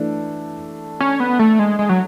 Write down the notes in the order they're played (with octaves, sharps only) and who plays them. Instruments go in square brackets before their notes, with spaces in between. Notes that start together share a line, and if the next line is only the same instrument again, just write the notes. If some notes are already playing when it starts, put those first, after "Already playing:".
Already playing: [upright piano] E3 A3 D4
[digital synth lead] C#4
B3
A3
G#3
G#3
F#3